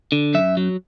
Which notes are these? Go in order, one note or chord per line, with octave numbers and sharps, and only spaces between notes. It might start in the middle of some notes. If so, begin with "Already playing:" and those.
D3
F#2 E5
F#3